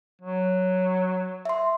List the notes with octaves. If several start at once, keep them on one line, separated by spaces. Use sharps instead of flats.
F#3
E5 C6